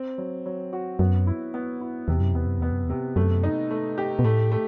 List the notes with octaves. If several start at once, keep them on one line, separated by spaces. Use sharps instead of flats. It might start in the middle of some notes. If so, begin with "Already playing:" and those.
Already playing: C4
F#3
F#3
F#4
F#2 B3
E4
B3
E4
E2 C3
F#2
E2 B3
F#2
E2 B3
F#2
E2
C3
F#2 A3
D#4
A3
G4
B2
A2 A3
A3